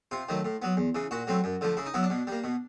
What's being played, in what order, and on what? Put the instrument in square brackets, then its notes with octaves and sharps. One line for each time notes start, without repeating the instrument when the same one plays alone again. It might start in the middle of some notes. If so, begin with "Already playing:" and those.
[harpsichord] C3 F4
D#3 F#3 A3
A2
F#3 B3
E2
C#3 E3
A#2 F#4
F#3 A3 C4
F#2
D3 F3 A3
C#3 E4
D#4
F#3 B3 E4
D4
B2
G3 A#3
B2